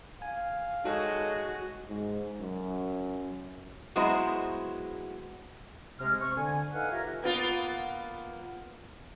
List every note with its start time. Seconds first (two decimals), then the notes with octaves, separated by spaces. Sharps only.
0.22 F5 G#5
0.84 G#3 D#4 F#4 A4 C#5
1.89 G#2
2.39 F#2
3.96 F#3 G#3 B3 E4 F#4 C5
6.00 C3 G#3 F6
6.21 C4 C#6
6.36 D3 G#5
6.73 D#4 A4 B4 F5 F#5 G#5
6.91 F4 G4 A4 A#4 C#5 E5
7.22 A#3 B3 F4